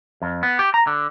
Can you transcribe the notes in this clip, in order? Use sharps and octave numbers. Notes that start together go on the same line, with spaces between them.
F2
B3
G4
A#5
D3